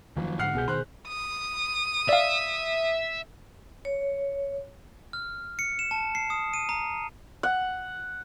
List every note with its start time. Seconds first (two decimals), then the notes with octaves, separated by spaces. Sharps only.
0.16 F#1 D#3 F3
0.39 G#2 D3 F#5 F6 C7
0.55 C2 B2 G#4 G6
0.68 D#3 C5 F#6
1.08 D#6
2.09 D5 E5 F5
3.85 C#5
5.13 F6
5.59 C#7
5.79 E7
5.91 A5
6.15 C7
6.30 D#6
6.54 D#7
6.69 A#5
7.43 F#5